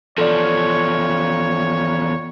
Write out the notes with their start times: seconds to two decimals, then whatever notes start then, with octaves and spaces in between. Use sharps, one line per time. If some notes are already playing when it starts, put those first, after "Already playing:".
0.18 E2 F3 A4 C#5 D5